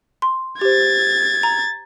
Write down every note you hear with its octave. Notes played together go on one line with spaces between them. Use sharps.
C6
G4 C5 G#6 A6
A#5